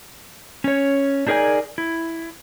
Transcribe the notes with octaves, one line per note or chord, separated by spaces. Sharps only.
C#4 C#5
D4 D#4 G#4 A#4 D5 G#5
E4